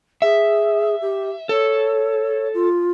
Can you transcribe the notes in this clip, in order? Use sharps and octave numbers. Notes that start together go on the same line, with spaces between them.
G#4 E5
G4
A4 C#5
F4